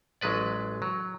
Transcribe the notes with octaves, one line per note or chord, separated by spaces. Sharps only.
A1 F#3 G#3 B4 D5
F#3